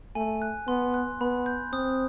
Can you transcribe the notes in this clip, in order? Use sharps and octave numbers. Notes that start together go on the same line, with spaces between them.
A3 G#5
F#6
B3 C6
F#6
B3 B5
G6
C4 D#6